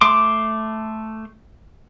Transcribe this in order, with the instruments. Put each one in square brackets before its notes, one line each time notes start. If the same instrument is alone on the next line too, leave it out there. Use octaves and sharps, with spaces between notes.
[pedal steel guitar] A3 C6 D6